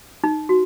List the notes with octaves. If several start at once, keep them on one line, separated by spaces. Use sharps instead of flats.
D#4
F#4